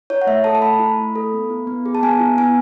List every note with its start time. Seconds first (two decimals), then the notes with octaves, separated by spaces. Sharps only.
0.10 E4 C#5
0.22 F#5
0.27 A3 E5
0.44 A4 A5
0.55 A5
0.62 A3 B5
0.79 E4
0.98 A3
1.15 A4
1.33 B3
1.50 E4
1.67 B3
1.86 G#4
1.95 A5
2.03 B3 G#5
2.20 E4
2.38 B3 G#5